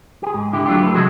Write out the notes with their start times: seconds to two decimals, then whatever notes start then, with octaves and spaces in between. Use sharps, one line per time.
0.23 G4 G#4
0.34 G#2
0.53 D3 E4 G4
0.66 F#3 A3 D4 F4 G4
0.83 A4 B4
0.94 C3 F3 F#3 G#3 F#4 A4